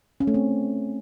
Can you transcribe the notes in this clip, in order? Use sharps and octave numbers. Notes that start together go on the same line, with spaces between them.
C#4
A3
C4